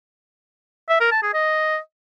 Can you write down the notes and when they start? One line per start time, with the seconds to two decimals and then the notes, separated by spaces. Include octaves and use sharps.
0.89 E5
1.00 A#4
1.11 A5
1.23 G#4
1.34 D#5